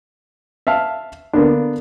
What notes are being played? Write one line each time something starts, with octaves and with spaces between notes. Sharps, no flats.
E5 F5 A5 F6
D3 A#3 B3 D4